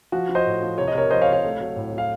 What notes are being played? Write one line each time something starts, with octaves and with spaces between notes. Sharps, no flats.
F3 F#4
F3
C5 D#5
A2
F3
C2 C#5
D#5
C2 A#4 C#5
F3 C5 D#5
C#5 F5
C2
C#5 F5
A3
F#3
A2
F#3 F5